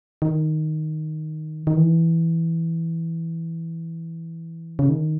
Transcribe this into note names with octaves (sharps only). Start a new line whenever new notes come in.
D#3
D#3
E3
C#3
D#3